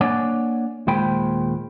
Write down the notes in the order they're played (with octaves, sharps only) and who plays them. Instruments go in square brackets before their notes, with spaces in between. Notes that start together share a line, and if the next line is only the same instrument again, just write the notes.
[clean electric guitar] A#3 D4 C#5 D5 F#5 G#5
D#2 A#2 G#3 C5 G5 B5